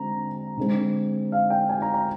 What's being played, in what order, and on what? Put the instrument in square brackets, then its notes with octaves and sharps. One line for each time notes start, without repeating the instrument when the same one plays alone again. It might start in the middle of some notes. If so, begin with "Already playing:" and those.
Already playing: [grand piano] D3 G#3 C4 A#5
D3 G#3 C4
F5
G5
G#5
A#5
A#5